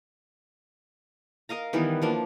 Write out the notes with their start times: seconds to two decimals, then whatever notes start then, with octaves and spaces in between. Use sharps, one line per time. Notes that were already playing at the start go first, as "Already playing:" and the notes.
1.49 A#4 D#5 F5 A#5
1.73 D#3 E3 G3 B3
2.02 F3 A#3 D4